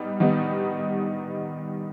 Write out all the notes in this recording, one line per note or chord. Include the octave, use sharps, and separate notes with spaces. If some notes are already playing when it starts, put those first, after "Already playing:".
Already playing: G3 B3 D#4
D#3 G3 B3 D#4